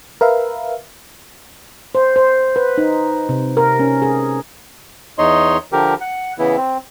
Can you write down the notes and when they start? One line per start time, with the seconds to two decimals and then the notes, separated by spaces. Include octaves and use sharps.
0.21 A#4 B4 E5 F5
1.95 C5
2.16 C5
2.56 B4
2.78 D#4
3.29 C3
3.57 A#4
3.80 C#4
4.02 G#4
5.18 E2 D#4 C#5 D#5 C6
5.72 D3 F3 G4 A#4
6.01 F#5
6.39 C#3 E3 B3 E4
6.57 C4